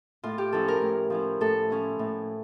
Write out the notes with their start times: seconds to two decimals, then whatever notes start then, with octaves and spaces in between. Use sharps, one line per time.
0.23 A2 F4
0.38 G4
0.53 F3 C#4 E4 A4
0.68 A#4
0.82 A2
1.10 F3 C#4 E4
1.41 A2 A4
1.70 F3 C#4 E4
1.99 A2